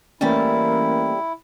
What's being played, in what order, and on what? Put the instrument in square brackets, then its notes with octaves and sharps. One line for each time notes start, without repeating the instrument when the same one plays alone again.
[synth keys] E3 A3 C#4 [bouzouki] G3 C4 A4 [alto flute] A#3 [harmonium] E4